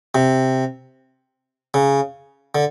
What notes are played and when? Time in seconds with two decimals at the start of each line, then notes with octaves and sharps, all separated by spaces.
0.15 C3
1.74 C#3
2.55 D3